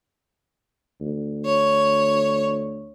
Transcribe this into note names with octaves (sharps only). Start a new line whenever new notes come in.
D2
C#5